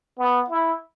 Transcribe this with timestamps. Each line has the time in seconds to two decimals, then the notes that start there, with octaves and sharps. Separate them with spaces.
0.19 B3
0.50 E4